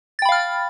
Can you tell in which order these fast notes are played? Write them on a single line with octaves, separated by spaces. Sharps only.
A6 G5 B5 F5 F6